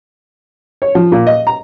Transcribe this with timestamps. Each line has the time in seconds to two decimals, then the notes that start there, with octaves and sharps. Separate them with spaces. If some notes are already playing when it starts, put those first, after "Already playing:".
0.82 C#5
0.95 F3
1.12 A#2
1.27 D#5
1.47 A#5